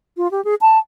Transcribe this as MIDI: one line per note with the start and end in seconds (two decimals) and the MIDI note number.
0.17 0.30 65
0.31 0.43 67
0.44 0.55 68
0.61 0.78 81